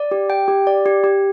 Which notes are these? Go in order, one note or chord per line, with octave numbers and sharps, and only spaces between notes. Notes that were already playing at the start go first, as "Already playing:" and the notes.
Already playing: D5
G4
G5
G4
D5
G4
G4